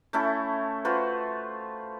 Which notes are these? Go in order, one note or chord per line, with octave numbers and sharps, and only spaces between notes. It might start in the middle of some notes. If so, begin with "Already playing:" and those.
A3 C#4 E4 A4
F4 F#4 B4 C5